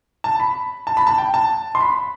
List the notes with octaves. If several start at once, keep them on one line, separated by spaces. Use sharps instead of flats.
A5
B5
A5
B5
A5
G5
A5
C6
B5